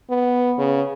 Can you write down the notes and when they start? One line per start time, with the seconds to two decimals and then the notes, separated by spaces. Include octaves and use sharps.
0.10 B3
0.58 C#3